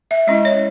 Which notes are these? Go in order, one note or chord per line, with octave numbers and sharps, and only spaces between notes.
E5
G#3 C#4 E4 D#5
C#5